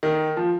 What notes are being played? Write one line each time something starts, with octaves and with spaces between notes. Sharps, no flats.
D#3
F3